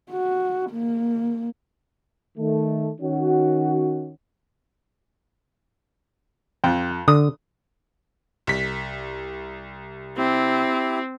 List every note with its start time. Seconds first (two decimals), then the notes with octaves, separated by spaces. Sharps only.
0.11 F#4
0.71 A#3
2.37 D#3 A3
3.01 D#3 C#4 F#4
6.64 F2 G5
7.08 D3 D#6
8.47 C2 B6
10.18 C4 E4 G4